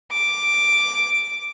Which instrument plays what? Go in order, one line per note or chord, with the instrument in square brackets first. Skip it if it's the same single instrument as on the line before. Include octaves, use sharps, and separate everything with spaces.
[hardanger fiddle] D6